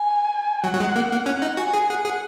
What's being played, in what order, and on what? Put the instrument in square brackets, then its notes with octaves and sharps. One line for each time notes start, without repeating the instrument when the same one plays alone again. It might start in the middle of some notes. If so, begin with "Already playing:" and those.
Already playing: [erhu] G#5
[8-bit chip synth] F#3 [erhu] F#5
[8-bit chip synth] F#3
G#3
A#3
A#3
[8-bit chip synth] C#4 [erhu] F#5
[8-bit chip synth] D#4
[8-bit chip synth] F#4 [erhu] G#5
[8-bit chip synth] G#4
[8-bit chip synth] G#4 [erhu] F#5
[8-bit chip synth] G#4